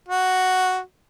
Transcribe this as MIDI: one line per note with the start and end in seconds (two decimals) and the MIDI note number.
0.08 0.79 66